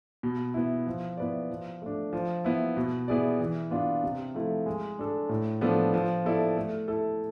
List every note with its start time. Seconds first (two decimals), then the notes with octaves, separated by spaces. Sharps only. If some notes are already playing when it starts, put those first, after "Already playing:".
0.23 B2
0.54 B3 E4
0.87 F3
1.17 B3 E4 B4 D5
1.50 F3
1.82 A3 D4
2.13 F3
2.45 B3 E4
2.77 B2
3.08 B3 E4 G#4 D5
3.40 E3
3.71 B3 D4 F4
4.04 C3
4.34 F3 A3 E4
4.66 G#3
4.99 D4 A4
5.29 A2
5.61 F3 B3 D4 A4
5.94 F3
6.25 B3 E4 A4 D5
6.57 A3
6.88 E4 A4